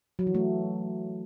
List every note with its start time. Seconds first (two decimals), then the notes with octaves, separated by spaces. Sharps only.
0.19 F#3
0.27 E3
0.34 A3